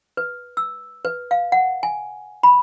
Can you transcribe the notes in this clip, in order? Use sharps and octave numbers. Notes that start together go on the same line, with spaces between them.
B4
E6
B4
F5
F#5
G#5
B5